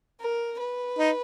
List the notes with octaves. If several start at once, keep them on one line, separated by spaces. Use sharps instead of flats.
A#4
B4
D#4